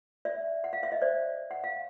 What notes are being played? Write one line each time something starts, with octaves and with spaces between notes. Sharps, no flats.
D5 E5
F#5
F5
E5
D#5
C5 D5
F#5
F5